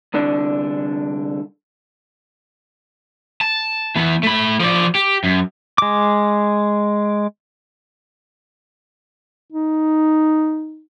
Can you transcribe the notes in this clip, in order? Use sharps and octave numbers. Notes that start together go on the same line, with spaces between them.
C2 D3 D4
A5
E3 B3
A3 B5
F3 D5
G4
F#2
G#3 D6
D#4